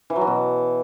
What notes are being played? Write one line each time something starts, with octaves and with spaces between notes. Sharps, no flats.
E3
F#3
E3
B2